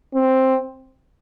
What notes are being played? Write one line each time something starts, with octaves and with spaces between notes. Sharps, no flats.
C4